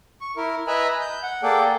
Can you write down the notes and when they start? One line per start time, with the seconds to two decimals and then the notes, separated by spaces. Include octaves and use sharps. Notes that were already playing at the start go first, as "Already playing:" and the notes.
0.21 C#6
0.36 E4 A#4
0.67 B4 D#5 E5 G#5 A#5 B5
1.01 G6
1.23 F#5
1.43 A#3 G#4 A4 D5 G5